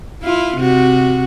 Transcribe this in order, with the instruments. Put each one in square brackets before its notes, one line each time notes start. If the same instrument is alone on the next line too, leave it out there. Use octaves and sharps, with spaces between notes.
[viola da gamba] E4 F4
C3 F#4